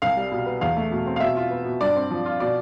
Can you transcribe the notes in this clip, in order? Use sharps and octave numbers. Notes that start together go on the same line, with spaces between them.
C2 F5
G3
B2
B3
E2 F5
A3
B2
C4
F5
B2 E5
F4
B3
B2
G2 D5
C4
F3
F4
B2 D5